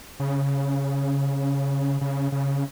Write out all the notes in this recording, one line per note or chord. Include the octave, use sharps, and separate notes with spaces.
C#3
C#3
C#3